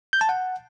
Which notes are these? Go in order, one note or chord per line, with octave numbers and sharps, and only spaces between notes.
G6
A5
F#5